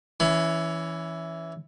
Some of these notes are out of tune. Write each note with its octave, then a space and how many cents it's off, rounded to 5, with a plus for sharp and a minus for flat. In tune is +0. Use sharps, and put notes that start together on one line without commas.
E3 +0 C#4 +20 B5 +35